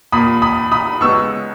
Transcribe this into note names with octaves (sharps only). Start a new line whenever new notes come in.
A#2 A#3 B5 D#6
B5 D#6
B5 D#6
C#2 C#3 G#3 B3 C#6 E6